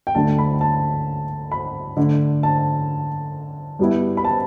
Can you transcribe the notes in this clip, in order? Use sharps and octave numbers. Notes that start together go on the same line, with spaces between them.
G5
D2 D3 A3 D4 A5
B5
A5
B5
D3 A3 D4
A5
G2 G3 B3 E4
B5
A5